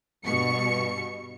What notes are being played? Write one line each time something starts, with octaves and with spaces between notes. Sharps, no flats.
G2 B2 C#6 C#7